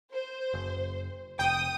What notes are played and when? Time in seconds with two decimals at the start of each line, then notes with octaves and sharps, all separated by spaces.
0.11 C5
0.54 F#1
1.39 F1 G5 D#6